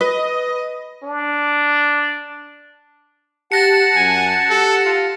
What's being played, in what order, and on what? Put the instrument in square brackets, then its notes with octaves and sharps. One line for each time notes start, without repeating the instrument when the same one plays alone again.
[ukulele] B4 [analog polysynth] D#5
[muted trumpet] D4
[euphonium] G4 [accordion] F#5 A5 [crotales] A6 A#6 C#7
[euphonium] F#2 [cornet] G#5
[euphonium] G4 [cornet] A4
[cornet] F4